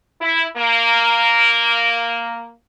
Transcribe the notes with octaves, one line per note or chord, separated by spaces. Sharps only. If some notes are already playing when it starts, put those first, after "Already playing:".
E4
A#3